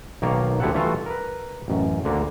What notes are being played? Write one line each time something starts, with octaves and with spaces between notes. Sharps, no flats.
B1 D#3 A#3 C#5 D5 F5
D2 F3 E4 G4 A4 F#5
E3 G3 A3 F4 F#4 A4
A#4 B4
A1 F#2
D2 D3 A#3